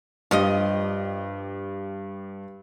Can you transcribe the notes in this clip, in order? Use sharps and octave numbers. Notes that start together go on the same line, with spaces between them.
G2 F3 F4 G4 D#5